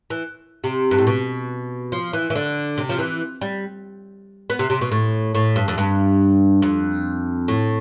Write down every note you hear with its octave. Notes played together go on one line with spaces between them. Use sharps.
E3
C3
G2
A2
B2
F3
E3
E3
D3
C3
F3
E3
G3
B3
C3
C3
B2
A2
A2
G2
F2
G2
F2
A2